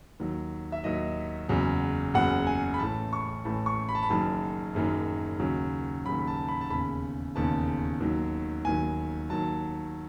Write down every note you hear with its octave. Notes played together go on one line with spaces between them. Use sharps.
D#2 D#3 F#3
E5
D#2 D#3 F#3 D#5
F#1 E2 C#3 F#3
F#1 E2 C#3 F#3 F#5
G#5
B5
A1 A2 E3 A5
C#6
A1 A2 E3 A5
C#6
B5
A5
B5
F#1 F#2 D#3 F#3 A5
F#1 F#2 D#3 F#3
D#2 C#3 F#3
D#2 C#3 F#3 B5
B5
A5
B5
A5
E1 D#2 C#3 B5
E1 D#2 C#3 A5
D#2 D#3 F#3
D#2 D#3 F#3 G#5
D#2 D#3 F#3 A5